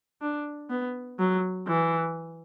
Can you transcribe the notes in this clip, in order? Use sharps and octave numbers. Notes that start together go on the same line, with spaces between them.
D4
B3
F#3
E3